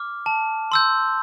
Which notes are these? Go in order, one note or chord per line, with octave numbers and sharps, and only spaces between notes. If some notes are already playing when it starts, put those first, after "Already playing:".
Already playing: D6 F6
A5
C6 E6 G6